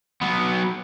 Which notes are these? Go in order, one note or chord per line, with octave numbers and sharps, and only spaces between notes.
F#3 B3